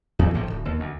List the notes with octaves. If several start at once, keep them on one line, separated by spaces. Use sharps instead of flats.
E2 E3
A#1 A2 D#3 F3
D1 G1
D#2
D2